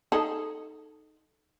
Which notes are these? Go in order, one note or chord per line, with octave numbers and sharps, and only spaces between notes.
D#4 G#4 A4